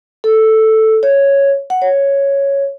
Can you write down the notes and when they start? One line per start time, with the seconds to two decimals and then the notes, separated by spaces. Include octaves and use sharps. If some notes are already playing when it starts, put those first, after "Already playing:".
0.24 A4
1.03 C#5
1.70 F#5
1.82 C#5